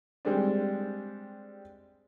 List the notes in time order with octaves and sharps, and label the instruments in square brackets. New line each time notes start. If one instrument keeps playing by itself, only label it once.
[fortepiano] G3 G#3 C4 D4